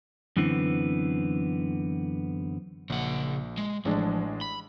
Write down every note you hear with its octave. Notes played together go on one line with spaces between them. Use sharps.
F#2 D3 E3 B3 C4
A#1 C#3 F#5
G#3
A1 F3 G#3 D4
B5